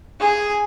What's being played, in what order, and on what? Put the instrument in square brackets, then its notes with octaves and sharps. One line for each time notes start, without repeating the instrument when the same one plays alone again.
[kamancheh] G#4